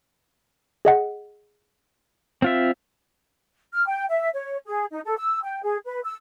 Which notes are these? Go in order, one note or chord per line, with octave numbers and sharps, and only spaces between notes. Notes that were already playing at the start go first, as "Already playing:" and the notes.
G#4 D#5 F#5
C4 F4 E5
F6
G5
E5
C#5
G#4
D#4
A4
E6
G5
G#4
B4
E6